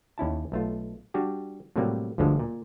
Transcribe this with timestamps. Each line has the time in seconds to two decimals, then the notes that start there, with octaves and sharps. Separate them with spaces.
0.18 D#2 C#4 E4 A5
0.52 B1 A3 F4
1.14 G3 D4 F#4 G4
1.76 A2 C3 F#3 G3 A#3
2.18 G1 D2 D3 F3 G#3 A4
2.39 A#2